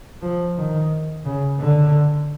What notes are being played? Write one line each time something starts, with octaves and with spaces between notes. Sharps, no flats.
F3
D#3
C#3
D3